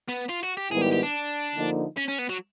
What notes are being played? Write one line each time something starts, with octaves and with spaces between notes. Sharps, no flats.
B3
F4
F#4
G4
G#2 D#3 G3 B3 E4 G#4
G4
G4
D4
D3 F3 A#3 D#4
C#4
C#4
B3
F#3